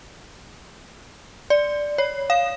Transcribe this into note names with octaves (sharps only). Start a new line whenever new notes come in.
D5
C#5
F5